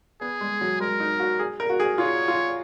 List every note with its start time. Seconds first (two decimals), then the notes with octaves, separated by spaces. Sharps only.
0.21 B3 G#4
0.41 G#3
0.61 F#3
0.80 G#3 A#4
1.00 D#4
1.20 F#4
1.39 G#4
1.60 A#4
1.69 F#4
1.80 G#4
1.98 F4 C#5
2.28 F4